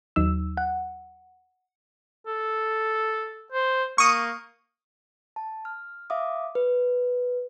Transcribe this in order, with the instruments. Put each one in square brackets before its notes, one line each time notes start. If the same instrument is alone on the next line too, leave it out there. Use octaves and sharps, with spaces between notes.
[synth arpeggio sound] D#2 F#3 D#4 E6
F#5
[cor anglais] A4
C5
[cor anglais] A#3 [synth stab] C#6 D#6
[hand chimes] A5
F6
E5 F5 D6 D#6
B4